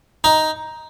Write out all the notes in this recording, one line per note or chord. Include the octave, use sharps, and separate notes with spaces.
D#4